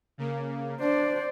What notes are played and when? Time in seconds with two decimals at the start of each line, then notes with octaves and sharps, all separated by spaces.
0.18 C#3 A#3
0.80 D4 C5 D5